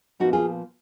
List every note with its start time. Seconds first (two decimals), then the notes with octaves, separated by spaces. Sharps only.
0.20 A#2 F3 B3 D#4 F#4
0.33 F4 G#4